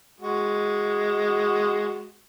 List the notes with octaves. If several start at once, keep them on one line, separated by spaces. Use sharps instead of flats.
G#3 F#4